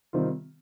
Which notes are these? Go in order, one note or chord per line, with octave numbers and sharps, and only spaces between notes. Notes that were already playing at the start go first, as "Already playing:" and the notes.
C3 D#3 G3 C4 F4